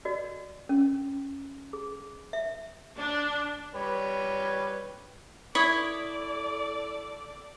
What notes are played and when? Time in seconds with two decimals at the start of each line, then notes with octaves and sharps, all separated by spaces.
0.05 F#4 D5 D#5
0.69 C#4
1.73 G#4
2.33 E5
2.97 D4
3.74 G3 B4 C#5
5.55 E4 A4 C#5 D5 D#6